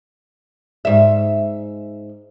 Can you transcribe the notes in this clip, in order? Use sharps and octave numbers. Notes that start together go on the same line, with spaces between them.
G#2 E5